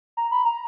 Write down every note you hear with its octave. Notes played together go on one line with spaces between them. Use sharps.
A#5
B5
A#5